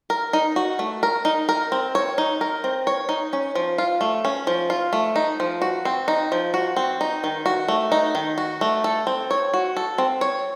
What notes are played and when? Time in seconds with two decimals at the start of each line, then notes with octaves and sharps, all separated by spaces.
0.10 A#4
0.33 D#4
0.56 F#4
0.79 A3
1.03 A#4
1.25 D#4
1.49 A#4
1.72 C4
1.95 C#5
2.18 D#4
2.41 A#4
2.64 C4
2.87 C#5
3.09 D#4
3.33 C#4
3.55 F3
3.78 F4
4.01 A3
4.25 C#4
4.47 F3
4.70 F4
4.93 A3
5.16 D#4
5.40 F3
5.62 F#4
5.85 C4
6.08 D#4
6.32 F3
6.54 F#4
6.76 C4
7.01 D#4
7.24 D#3
7.46 F#4
7.68 A3
7.92 D#4
8.15 D#3
8.38 F#4
8.61 A3
8.84 A4
9.07 C4
9.31 C#5
9.54 F#4
9.77 A4
9.98 C4
10.21 C#5